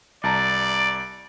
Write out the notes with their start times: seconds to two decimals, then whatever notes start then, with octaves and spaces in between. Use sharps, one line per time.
0.23 C2 D5 A5 A#5